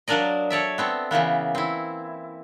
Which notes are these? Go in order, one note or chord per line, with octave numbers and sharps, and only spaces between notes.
F#3 A#3 D4 A#4 D5 D#5
A4 C#5 D5 E5
B3 C4 A4
C#3 E3 A#3 B3
C4 E4